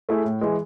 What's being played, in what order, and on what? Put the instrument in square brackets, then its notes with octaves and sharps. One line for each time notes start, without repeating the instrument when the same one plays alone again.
[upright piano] A3 E4 G#4
A2
E3 G#3